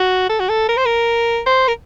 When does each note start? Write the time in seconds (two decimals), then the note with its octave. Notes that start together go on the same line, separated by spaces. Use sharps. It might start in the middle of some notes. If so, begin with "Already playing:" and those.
Already playing: F#4
0.29 A4
0.40 F#4
0.49 A4
0.69 A#4
0.77 C5
0.86 A#4
1.46 C5
1.68 A#4